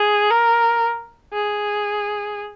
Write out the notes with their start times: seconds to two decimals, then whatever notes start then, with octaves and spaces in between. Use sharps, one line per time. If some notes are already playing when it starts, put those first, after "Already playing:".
Already playing: G#4
0.31 A#4
1.33 G#4